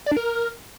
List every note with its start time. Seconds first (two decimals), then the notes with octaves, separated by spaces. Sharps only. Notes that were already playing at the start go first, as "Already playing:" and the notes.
0.06 D5
0.11 D4
0.17 A#4